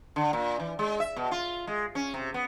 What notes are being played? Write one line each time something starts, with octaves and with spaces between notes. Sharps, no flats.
D3
A#2
E3
G#3
E5
B2
F4
G#3
C#4
C3
B3